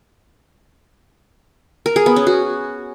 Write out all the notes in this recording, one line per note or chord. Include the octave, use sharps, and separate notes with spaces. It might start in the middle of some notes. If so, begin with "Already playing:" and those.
A#4
G#4
B3
C#4
F#4